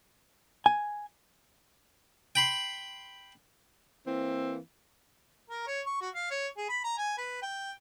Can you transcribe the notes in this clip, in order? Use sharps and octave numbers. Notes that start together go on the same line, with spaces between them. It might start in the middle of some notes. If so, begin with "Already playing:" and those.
G#5
G5 B5 C6
E3 A#3 C4
A#4
C#5
C#6
F#4
F5
C#5
G#4
B5
A#5
G#5
B4
G5